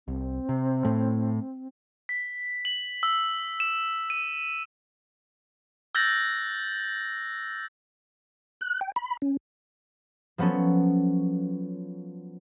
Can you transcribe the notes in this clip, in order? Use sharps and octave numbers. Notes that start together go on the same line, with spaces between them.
C2 C4
C3
A2 A3
B6
F#7
E6
E7
D#7
E6 F#6 G6 A6 A#6 F#7
F#6
G5
B5
C#4
F3 F#3 B3 C#4 A4